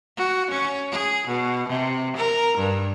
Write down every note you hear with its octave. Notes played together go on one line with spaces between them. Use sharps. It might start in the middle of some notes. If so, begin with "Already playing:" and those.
F#4
C#4
G#4
B2
C3
A#4
G2